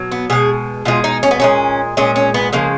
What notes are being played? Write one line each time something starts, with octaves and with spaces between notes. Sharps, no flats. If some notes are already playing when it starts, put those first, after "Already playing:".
Already playing: B2 F#3
B3
B2 G#3 G#4
B2 G#3 F4
D#4
C#4
B3
A#2 G#3 C#4
A#2 G#3 C#4
C#4
B3
C#3 F3 G#3 A#3